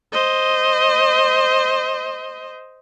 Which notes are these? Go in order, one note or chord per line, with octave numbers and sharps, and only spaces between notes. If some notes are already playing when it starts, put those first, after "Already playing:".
C5 D#5